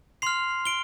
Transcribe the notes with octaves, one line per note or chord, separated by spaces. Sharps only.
C6 F6 C7 F7
D7 G7